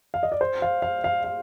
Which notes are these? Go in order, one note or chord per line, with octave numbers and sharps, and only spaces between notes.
F5
D#5
D5
C5
F5
F5
F5
F5